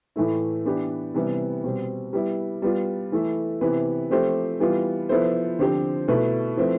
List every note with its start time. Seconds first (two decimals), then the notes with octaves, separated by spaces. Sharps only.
0.16 A2 E3 A3 E4
0.65 E3 B3 D4 G4 B4
1.14 C3 E3 G3 B3
1.64 B2 G3 C4
2.13 G3 B3 E4
2.62 G3 B3 F4
3.12 E3 A3 E4 A4
3.61 C3 E3 B3 E4 B4
4.10 F3 A3 C4 G4 C5
4.60 E3 G3 B3 F4
5.09 F3 B3 E4 A4 C5
5.59 D3 F3 C4 G4 C5
6.08 B2 A3 E4 B4
6.57 F3 A3 C4 E4 B4